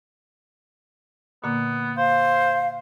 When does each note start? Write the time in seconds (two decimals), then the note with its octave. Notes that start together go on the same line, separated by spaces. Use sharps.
1.44 A#2 D3 A#3 B3
1.97 C5 F5